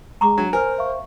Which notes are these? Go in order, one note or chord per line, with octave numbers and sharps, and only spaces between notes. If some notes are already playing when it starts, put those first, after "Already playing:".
G#3 A#5 C#6 D6
F#3 D4
A#4 C5 G#5 F6
E5 F5 C#6